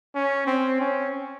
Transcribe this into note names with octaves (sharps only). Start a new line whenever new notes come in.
C#4
C4
C#4